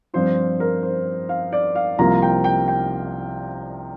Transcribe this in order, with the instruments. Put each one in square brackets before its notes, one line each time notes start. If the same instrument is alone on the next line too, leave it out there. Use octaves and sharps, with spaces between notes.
[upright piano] G2 F3 C4 F4 C5
A#4
C5
F5
D5
F5
C2 C3 F3 A#3 F4 A#5
G5
G5
G5